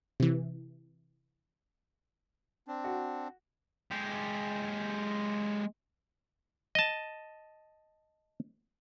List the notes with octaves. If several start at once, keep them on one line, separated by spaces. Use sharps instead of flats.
C3 E3
C4 D4
F#4
G#3 G4
D#5 A5